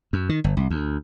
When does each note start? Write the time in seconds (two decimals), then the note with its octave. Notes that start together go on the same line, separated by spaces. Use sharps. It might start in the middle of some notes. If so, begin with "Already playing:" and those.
0.13 F#2
0.29 D#3
0.44 G1
0.57 C2
0.70 D2